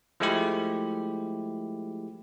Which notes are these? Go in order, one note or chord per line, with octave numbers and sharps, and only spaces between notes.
F3 G#3 A3 E4 G4